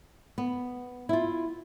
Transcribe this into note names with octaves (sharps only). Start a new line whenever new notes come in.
B3
E4 F4